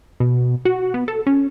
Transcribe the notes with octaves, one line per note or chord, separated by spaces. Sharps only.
B2
F#4
B3
A4
C#4